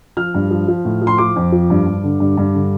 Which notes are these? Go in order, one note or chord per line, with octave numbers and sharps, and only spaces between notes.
F3 F6
G2
F3
F3
A2
F3
C6
F3 D6
F2
F3
G2
G2
D3
G2
G2
D3